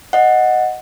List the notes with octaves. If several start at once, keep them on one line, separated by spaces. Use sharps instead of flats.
D#5 F#5